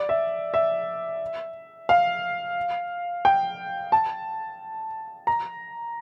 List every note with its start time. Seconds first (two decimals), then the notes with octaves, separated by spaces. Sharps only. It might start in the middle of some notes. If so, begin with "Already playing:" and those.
Already playing: D5
0.09 E5
0.54 E5
1.89 F5
3.25 G5
3.92 A5
5.27 A#5